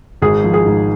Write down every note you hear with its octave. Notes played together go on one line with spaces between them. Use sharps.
G#1 G#4
F3
G#4
G#2